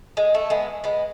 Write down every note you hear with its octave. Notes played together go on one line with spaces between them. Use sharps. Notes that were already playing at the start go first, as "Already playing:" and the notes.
G#3
A3
G#3 B3
G#3 B3